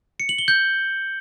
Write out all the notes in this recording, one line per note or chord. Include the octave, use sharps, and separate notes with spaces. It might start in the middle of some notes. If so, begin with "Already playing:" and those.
C#7
F#7
G7
G6